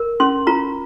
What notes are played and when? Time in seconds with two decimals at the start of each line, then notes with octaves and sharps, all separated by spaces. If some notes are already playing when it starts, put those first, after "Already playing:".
Already playing: A#4
0.20 C#4 C6
0.47 F4 A#5